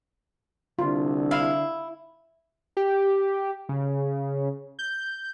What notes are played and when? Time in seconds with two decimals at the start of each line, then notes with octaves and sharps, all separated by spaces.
0.79 C2 D3 F4
1.31 E4 F5
2.77 G4
3.69 C#3
4.79 G6